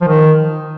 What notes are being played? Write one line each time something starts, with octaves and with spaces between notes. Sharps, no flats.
F3
D#3